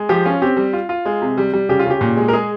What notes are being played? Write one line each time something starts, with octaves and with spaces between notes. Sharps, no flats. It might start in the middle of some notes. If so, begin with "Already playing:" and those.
Already playing: G#3
F3 G4
C#4 F4
C4 G4
G3
F4
F4
G#3
C3
G3
G3
C#3 G4
F4
C#3
G4
A#2
G#3
A#4
G#3 G#4